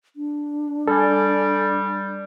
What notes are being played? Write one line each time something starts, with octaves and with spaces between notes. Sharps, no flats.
D4
G3 A4 D5 G#5